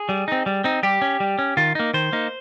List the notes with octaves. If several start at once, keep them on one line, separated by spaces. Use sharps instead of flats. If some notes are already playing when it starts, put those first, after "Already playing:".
Already playing: G#4
G3
C4 D#4
G3
C4 D#4
G3 G4
C#4
G3
C#4
D#3 F4
A#3 D#4
D#3 C5
A#3 D#4